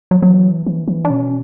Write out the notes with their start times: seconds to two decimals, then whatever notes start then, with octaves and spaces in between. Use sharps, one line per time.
0.11 F#3
0.22 E3 F#3
0.66 E3
0.88 E3
1.05 D4
1.10 B2 C#4